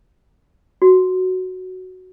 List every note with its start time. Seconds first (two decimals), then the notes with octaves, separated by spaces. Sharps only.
0.82 F#4